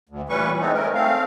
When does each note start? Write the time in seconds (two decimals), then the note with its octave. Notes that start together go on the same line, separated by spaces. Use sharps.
0.09 D2
0.29 A#2 E3 G3 C#4 B4 C#6
0.60 G#3 A3 B3 C4 D#4
0.74 A3 C#4 A#4
0.95 A3 C4 F5